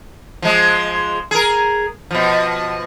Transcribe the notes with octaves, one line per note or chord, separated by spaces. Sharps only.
F3 G#3
G#4 A#4
B2 F3